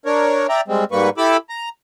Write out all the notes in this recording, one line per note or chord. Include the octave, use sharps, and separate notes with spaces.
D4 A#4 C#5
D5 E5 G5 A#5
G3 G#3 C4
G#2 G3 A#3 B4 C#6
E4 G4 A4 B5 D6 E6
A#5